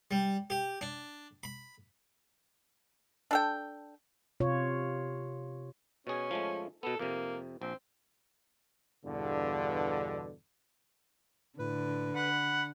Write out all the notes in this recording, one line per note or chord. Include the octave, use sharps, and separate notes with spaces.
G3
G4
D4
B5
D4 A4 G5
C3 F4 C#5
B2 C#4 G#4
F3 G#3 A3
B2 B3 A4
F2 C3 A#3
A#1 C4
E2 G2 B2 D3
A2 D3 B4
F#5 B5